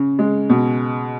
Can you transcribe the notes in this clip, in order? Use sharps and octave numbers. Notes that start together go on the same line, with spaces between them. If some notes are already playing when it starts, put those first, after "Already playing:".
Already playing: C#3
G#3
B2